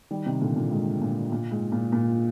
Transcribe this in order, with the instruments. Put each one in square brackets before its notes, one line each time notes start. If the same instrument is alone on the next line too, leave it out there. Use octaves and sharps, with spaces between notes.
[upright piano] D#3 G3
C3 D#3
A#2 D3
A#2
G#2
A#2
A#2
G#2
A#2
A#2